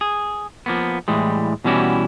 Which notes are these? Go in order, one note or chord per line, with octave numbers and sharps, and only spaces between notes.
G#4
F3 A#3 B3
A2 E3 G3 G#3
B2 E3 G3 C#4 E4 F#4